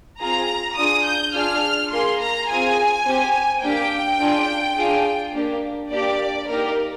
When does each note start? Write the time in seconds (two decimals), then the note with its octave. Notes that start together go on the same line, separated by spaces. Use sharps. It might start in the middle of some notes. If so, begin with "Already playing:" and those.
0.20 C4 F4 G#4 A#5
0.76 D4 F4 G#4 D#6
1.05 G6
1.34 D4 F4 G#4 F6
1.91 A#3 F4 G#4 C6
2.20 A#5
2.48 C4 F4 G#4 G#5
3.05 C4 G4
3.62 A#3 D4 G4 G5
4.20 D4 F4 G#4
4.77 D4 F4 G#4
5.34 A#3 D4 G4
5.91 A#3 D4 G4 D5
6.48 A#3 D#4 G4 A#4